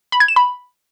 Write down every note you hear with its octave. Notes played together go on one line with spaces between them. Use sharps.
B5
G#6
E7
B5